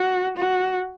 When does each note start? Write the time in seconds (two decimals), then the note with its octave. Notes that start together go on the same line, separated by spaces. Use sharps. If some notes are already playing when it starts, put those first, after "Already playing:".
Already playing: F#4
0.37 F#4